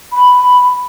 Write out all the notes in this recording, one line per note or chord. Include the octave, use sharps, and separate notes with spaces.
B5